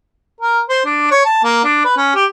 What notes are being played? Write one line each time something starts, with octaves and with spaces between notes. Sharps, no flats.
A#4
C5
D4
C#5
A5
A#3
D4
B4
C#4
G4